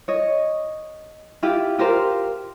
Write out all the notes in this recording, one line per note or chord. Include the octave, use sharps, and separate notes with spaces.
C#5 D#5
E4 F4 G4
F4 G4 A#4 C5